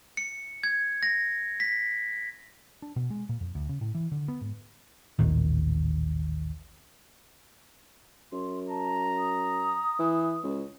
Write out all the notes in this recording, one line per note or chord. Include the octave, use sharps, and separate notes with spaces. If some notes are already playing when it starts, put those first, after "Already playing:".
C#7
G#6
A#6
B6
D4
B2
G#3
A#2
F2
D2
C#3
A2
E3
D3
B3
G#2
A1 D#2 A#2 D#3
F#2 C6
A5 A#5
D#6
E3
C#2